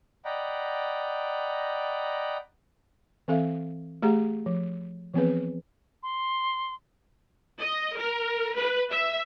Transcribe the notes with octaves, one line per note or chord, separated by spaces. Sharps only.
D5 D#5 F#5 G5 A#5 B5
E3 C4 A4 E5 F5
A3 G4 G#4 F#5 A#5
F3
E3 F3 B3 C4 G#4 B4
C6
D#5
A#4
B4
E5